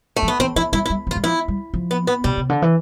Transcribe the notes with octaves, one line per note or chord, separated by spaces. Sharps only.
A3
F3
B3
E3 C4
F3 E4
G3 E4
E4
G3
F3
F4
G3
F3 E4
G3
F3
B3
B3
B2 G3
C3
D3
E3